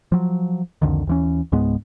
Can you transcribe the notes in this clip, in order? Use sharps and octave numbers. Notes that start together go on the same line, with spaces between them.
F3 F#3
C2 F2 D3 D#3
D#2 E3 C#4
C#2 G#2 G#3 B3